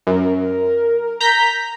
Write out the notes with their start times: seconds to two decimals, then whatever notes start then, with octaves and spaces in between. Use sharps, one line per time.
0.07 F#2 A#4
1.21 A#5 G6 B6